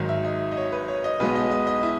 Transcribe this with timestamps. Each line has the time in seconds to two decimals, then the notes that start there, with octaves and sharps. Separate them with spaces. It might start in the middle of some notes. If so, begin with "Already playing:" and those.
Already playing: G#1 G#2 D#3 F#3
0.09 E5
0.24 D#5
0.52 D#5
0.57 C#5
0.72 B4
0.88 C#5
1.04 D#5
1.20 B1 B2 G#3 B3 B4
1.35 D#5
1.51 D#5
1.67 D#5
1.83 E4